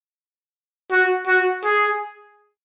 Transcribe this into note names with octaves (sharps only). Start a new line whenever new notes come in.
F#4
F#4
G#4